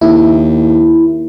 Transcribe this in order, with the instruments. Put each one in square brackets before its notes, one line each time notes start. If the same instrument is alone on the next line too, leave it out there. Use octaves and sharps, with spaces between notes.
[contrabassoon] D#2 [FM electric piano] E4